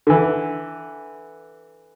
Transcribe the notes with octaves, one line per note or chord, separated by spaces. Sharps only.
D3 E3